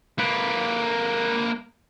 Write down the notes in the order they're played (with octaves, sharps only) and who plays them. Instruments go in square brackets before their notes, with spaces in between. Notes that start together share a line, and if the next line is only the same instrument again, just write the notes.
[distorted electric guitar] A#3 B4